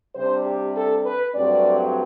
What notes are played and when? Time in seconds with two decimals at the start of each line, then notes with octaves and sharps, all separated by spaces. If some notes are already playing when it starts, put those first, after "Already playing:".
0.15 C3 G3 D4 C5
0.45 G4
0.75 A4
1.05 B4
1.35 G2 F#3 A3 C4 D5